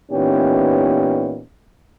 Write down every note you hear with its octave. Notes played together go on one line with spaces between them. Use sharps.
A#2 E3 B3 C#4 D#4 G4